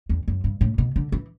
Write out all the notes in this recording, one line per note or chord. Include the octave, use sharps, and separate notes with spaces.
E2
F#2
G2
A2
B2
D3
E3